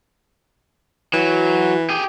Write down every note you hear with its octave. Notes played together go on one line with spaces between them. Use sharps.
E3 F#3
G4 G#4